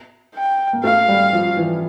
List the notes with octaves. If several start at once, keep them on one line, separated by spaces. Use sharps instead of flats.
G5
A#3
A3 F5
G3
F3
E3